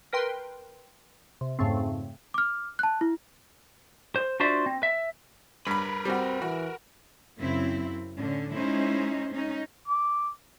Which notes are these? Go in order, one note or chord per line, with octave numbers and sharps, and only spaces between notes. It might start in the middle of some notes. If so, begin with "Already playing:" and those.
A#4 B4 G5 C6
C3
F2 G#2 C#3 A3 C4
D6 F6
A5 F#6
E4
C5
D4 F4 F#4 C5 D5 E5
C4
E5
G2 A#4 B4 B5
G3 C4 F#4
E3 F#4
F#2 C#3 C4 E4
A2 D3 C#4
G#3 C#4 D#4 E4 C5
C#4 D#4
D6